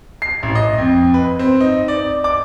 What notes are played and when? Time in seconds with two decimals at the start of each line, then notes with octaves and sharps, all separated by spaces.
0.22 C7
0.43 A1
0.55 D#5
0.78 F2
1.14 B4
1.39 C4
1.60 D#4
1.88 D5
2.24 D6